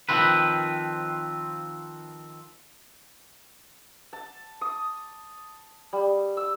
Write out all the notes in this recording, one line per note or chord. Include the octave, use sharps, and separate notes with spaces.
D#3 F3 C4 B4
A5
D#6
G3
E6